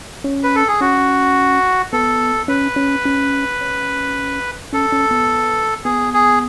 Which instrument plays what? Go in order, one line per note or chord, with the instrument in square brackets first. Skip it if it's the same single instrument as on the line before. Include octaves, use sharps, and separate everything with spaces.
[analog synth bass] C#4
[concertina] B4
A4
G#4
[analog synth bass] C#4 [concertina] F#4
[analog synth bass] B3 [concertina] A4
[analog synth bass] C#4 [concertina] B4
[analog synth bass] C#4
C#4
C#4
[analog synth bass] C#4 [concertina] A4
[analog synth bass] C#4
B3
[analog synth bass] B3 [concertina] G#4
[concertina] G#4